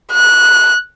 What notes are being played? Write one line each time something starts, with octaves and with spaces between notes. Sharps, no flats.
F#6